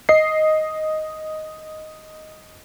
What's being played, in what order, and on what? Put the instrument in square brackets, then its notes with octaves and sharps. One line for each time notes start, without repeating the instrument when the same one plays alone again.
[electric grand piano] D#5 C7